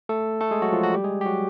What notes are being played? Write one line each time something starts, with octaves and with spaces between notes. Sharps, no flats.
A3 A4
A3 A4
G#3 G#4
F#3 F#4
F3 F4
F#3 F#4
G3 G4
G#3 G#4
G4
F#3 F#4